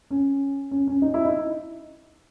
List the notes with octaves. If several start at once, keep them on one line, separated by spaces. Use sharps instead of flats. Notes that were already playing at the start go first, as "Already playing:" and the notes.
C#4
C#4
C#4
D#4
E4
D#4